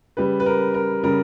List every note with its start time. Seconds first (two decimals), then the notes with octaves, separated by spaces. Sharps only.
0.17 C#3 G3 B4
0.40 B4
0.46 A#4
0.74 A#4
1.03 C#3 G3 A#4